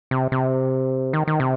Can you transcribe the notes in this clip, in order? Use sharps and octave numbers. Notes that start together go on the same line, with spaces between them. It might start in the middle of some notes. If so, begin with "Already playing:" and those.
C3
C3
D#3
D#3
C3